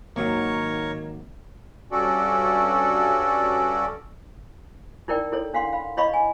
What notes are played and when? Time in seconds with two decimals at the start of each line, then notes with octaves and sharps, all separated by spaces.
0.16 G#1 D#3 F#3 A#3 A#4 C#5 C#6
1.92 G2 C#4 F#4 A4 D5
5.08 D#4 E4 A#4 D5 G5
5.32 E4 A4 C#5
5.54 D4 F5 F#5 C6
5.73 F5 B5
5.97 E4 C#5 D#5 F5 B5 C#6
6.13 G#5